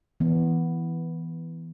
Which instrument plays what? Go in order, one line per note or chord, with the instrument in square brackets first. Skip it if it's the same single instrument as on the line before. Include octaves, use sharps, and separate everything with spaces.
[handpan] E3 B3